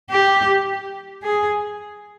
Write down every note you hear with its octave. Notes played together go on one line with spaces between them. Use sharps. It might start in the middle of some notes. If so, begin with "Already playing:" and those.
G4
G#4